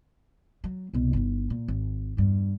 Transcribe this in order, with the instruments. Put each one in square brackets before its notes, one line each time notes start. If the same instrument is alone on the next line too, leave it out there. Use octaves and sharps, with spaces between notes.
[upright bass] F#3
C2 B2
G1 D#4
A#2
G#1
E2 G2